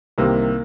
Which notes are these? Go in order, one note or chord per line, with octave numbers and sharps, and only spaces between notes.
C2 C3 D#3 A#3